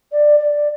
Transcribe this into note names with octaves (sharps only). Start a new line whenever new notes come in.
D5
D5